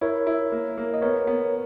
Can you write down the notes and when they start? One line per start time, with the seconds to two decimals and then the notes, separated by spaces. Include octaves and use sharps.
0.01 E4 A#4 C#5
0.27 E4
0.52 A#3
0.78 A#3
0.94 D#5
1.02 B3 A#4 C#5
1.27 B3